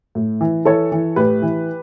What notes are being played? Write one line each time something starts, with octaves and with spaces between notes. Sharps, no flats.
A2
E3
E3 A4 C#5
E3
A2 G4 B4
E3